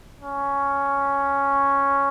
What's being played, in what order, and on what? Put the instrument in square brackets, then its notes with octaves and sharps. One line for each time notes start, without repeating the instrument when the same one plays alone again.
[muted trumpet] C#4